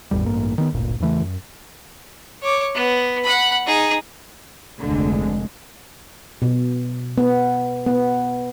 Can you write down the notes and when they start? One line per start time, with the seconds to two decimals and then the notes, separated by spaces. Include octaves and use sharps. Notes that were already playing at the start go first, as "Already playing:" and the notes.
0.11 G#1 E2 A2 G3
0.26 A1 G2 A#3
0.58 D#3 B3
0.73 D1 G1 A#2
1.00 E2 C#3 E3 A3
1.21 F#2
2.43 C#5 D6
2.75 B3
3.24 F#5 B5
3.66 D#4 G#4
4.81 F1 D2 D3 G#3
6.42 B2
7.18 B3
7.86 B3